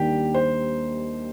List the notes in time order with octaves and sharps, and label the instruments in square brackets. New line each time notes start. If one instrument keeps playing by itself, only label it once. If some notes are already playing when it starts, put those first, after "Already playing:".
Already playing: [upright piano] D#2 D#3 G3 D4 [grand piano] G4
[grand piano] C5